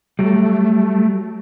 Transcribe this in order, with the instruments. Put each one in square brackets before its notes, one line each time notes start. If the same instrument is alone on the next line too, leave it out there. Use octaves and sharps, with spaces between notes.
[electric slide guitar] F#3 G3 [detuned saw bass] A3